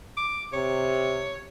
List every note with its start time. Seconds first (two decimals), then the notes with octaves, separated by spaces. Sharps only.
0.17 D6
0.53 C3 C#5